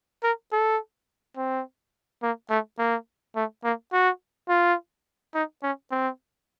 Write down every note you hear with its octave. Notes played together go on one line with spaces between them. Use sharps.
A#4
A4
C4
A#3
A3
A#3
A3
A#3
F#4
F4
D#4
C#4
C4